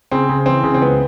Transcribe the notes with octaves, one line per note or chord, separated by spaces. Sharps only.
C#3 C4
C#3
E3 C4
C#3
C4
C#2 B3